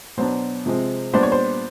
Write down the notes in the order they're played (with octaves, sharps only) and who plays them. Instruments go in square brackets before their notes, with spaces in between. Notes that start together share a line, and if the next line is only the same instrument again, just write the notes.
[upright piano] B2 F#3 B3 D4 C5
C3 F3 G#3 C4
A#2 G3 B3 D4 C5
C#5
C5